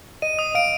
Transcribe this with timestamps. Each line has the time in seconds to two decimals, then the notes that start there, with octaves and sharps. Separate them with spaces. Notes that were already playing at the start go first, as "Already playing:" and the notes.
0.22 D#5 D#7
0.39 D#6
0.55 F5 D7